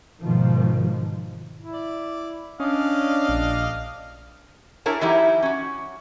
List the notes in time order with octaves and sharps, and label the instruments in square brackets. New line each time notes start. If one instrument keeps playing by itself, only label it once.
[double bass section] G#2 B2 D#3 F3
[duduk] E4
[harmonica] D5
[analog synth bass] C#4 [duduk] D4 [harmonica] D5 D#5 F5
[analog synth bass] A#1
[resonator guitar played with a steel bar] D4 E4 G#4 A#4 C#5 A5
E3 F#3 D#4 E4 G4
C#4 F#4